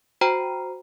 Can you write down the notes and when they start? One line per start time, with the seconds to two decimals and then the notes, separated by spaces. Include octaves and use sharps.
0.21 F#4 C5 G5 A#5